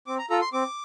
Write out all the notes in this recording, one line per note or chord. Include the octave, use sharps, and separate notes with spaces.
C4 D6
A#5
F4 A4 A#5
C6
C4 D6